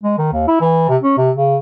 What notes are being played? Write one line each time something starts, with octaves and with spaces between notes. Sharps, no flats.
G#3
D#3
D#2
E4
E3
C3
C#4
C3
C#3